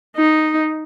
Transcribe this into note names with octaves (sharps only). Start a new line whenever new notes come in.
D#4